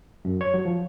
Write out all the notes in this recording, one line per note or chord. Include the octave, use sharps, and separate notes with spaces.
F#2
C#5
F#3
F3